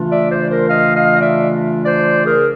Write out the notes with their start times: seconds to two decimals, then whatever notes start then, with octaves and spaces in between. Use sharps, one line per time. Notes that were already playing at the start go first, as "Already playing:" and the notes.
Already playing: C#3 E3 A3 D4 F4
0.11 D5 E5
0.30 C5 D5
0.49 A#4 C5
0.69 D#5 F5
0.95 D#5 F5
1.16 D#5
1.21 D5 E5
1.85 C5 D5
2.24 G#4 A#4